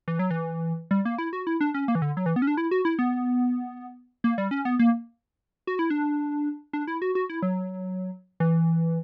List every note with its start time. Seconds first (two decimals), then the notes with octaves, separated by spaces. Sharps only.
0.08 E3
0.19 F#3
0.31 E3
0.91 G3
1.05 A#3
1.18 E4
1.33 F#4
1.47 E4
1.61 D4
1.74 C#4
1.88 A#3
1.95 E3
2.02 D3
2.17 F#3
2.26 E3
2.36 B3
2.42 C#4
2.47 D4
2.57 E4
2.71 F#4
2.85 E4
2.99 B3
4.24 A#3
4.38 G3
4.51 C#4
4.65 B3
4.79 A#3
5.67 F#4
5.79 E4
5.90 D4
6.73 D4
6.87 E4
7.02 F#4
7.15 F#4
7.30 E4
7.42 F#3
8.40 E3